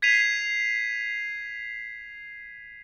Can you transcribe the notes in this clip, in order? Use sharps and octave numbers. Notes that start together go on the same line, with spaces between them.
G#6 B6 C7 D#7 F7